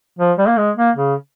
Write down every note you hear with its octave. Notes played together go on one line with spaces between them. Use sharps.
F3
G3
A#3
G#3
A#3
C#3